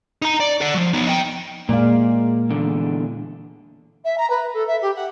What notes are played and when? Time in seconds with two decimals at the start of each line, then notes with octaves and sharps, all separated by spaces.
0.22 D#4 A#5
0.40 D5
0.61 D5 F#5
0.75 F3 F#3
0.94 B3 D#4
1.07 D#5 G5
1.69 A#2 G#3 A#3 D5 F5
2.50 E2 D3
4.04 E5
4.17 A#5
4.30 B4
4.53 A4
4.67 E5
4.81 G4
4.95 F#5